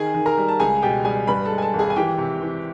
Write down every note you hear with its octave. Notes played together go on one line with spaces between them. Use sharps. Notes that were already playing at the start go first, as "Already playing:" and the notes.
Already playing: D#3 G#4 G#5
D#3
A#4 A#5
G3
A5
C#2 G#4 G#5
B2 G4 G5
G3 G#4 G#5
G2 B4 B5
A4 A5
G#3
G#5
A4 A5
G#1
G#4 G#5
G#5
E3 G4 G5
C3
E3